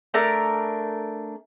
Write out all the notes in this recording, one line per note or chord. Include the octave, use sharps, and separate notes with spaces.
A3 D4 A#4 A#5